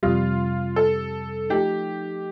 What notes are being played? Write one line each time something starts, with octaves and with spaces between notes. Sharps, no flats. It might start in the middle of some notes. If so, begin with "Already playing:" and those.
F2 C3 G3 F4
A4
F3 A3 D#4 G4